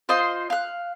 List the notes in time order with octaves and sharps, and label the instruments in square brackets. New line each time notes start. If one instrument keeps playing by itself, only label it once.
[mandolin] F4 C5 D#5 C6
F5 F#6